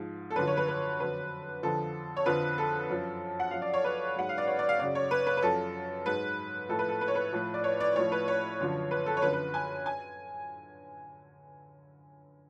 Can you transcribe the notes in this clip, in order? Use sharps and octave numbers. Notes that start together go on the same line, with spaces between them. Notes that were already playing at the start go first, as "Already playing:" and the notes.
Already playing: G#2 F3
A4
F#2 D3 F3 B4
C#5
B4
B4
F2 D3 F#3 B4
F2 D3 F3 A4
C#5
F2 D3 F3 B4
A4
F#2 F3
F#5
F#2 F3 F5
D5
C#5
B4
G#2 F#3 F#5
F5
D5
C#5
D5
F5
F#2 C#3 F#3 D5
C#5
B4
B4
B4
F#2 F3 A4
G#2 F#3 B4
A2 F3 A4
B4
A4
B4
C#5
B4
A2 F3
D5
C#5
D5
A2 F3 C#5
B4
C#5
F#2 D3 F3
B4
A4
C#5
F#2 D3 F3 B4
B4
G#5
G#5